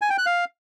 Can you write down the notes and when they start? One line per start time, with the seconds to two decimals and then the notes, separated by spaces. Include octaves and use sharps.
0.02 G#5
0.10 G5
0.18 F#6
0.26 F5